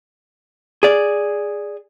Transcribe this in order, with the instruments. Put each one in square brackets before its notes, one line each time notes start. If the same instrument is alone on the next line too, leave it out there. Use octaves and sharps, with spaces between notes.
[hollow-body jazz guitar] G#4 D5